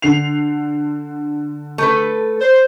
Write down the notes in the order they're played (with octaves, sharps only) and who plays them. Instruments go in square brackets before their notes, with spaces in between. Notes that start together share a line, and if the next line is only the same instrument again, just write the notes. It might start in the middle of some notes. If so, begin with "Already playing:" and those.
[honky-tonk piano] D3 C7 F7
[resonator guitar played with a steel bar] A3 A4 B4
[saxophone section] C5